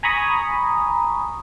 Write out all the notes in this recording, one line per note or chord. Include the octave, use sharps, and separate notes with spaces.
G#5 A#5 B5 C#6 D#6